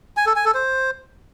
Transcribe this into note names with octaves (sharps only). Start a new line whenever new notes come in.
G#5
A4
G#5
A4
C5